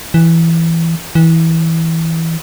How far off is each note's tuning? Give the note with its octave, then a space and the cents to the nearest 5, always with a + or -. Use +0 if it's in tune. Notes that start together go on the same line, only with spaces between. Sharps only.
E3 +5
E3 -15